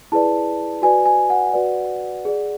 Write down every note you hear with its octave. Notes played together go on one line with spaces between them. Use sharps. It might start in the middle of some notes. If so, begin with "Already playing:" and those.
E4 G#4 B4 D5 A5
F#4 B4 D5 G#5
G#5
F#5
F#4 B4 D5
G#4 D5